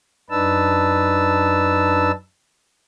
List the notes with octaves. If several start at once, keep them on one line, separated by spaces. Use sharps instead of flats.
F#2 D4 D#4 B4 A5 E6